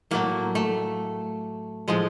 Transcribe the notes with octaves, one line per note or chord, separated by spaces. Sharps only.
A2 F#3 A3 A#3
A3
A2 F3 G#3